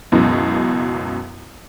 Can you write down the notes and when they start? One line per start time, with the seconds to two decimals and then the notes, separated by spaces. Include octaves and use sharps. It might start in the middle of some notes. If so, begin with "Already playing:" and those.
0.12 C#2 F#2 B2 E3